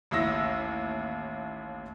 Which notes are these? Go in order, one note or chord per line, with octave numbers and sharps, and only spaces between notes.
A1 D#2 E4 E6 A#6